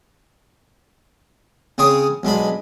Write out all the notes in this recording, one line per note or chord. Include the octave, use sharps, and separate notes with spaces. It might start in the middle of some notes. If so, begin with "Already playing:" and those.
C#3 C4 G#4 C#5 D#6
B1 G#3 D4 B5